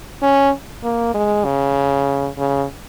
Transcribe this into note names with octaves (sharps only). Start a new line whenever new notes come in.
C#4
A#3
G#3
C#3
C#3